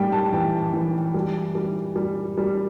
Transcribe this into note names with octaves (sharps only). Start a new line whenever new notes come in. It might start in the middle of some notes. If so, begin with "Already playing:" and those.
Already playing: A2 G3 G5
A5
E3 G5
E3
G3
G3
G3
G3